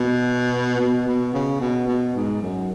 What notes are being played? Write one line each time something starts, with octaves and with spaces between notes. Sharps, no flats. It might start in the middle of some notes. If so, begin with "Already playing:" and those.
Already playing: B2
B2
B2
C#3
B2
B2
G#2
F#2